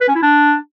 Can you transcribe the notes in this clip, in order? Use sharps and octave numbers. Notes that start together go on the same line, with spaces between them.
B4
C#4
E4
D4